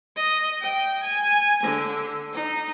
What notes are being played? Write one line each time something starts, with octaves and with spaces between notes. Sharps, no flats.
D#5
G5
G#5
D3
D#4